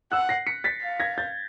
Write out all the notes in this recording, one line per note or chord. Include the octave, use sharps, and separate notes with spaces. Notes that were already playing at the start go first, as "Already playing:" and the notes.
F#5 E6 F#6
A#6 C7
B6 C#7
A6 B6
F5
G#6 A#6
G6 A6